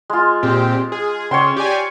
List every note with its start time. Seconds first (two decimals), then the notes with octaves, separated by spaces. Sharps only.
0.10 G#3 F4
0.43 A#2 C4 G4
0.92 G#4
1.31 C#3 C#5 G5 C6
1.57 G4 D5 G#5